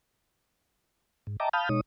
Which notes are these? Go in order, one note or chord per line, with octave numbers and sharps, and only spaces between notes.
G#2
D#5 E5 G5 A5 A#5 D6
F5 A5 B5 D#6 F6 G6
B2 G#3 D#4 C#5 D#6